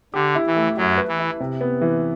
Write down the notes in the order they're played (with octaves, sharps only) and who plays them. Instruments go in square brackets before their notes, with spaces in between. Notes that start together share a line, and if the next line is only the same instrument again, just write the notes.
[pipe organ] D3 [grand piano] G4
[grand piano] E4
[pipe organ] E3
[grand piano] A3
[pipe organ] F#2 F#3 [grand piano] E5
[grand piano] B4
[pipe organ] E3
[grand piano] E4
C3
B3
E3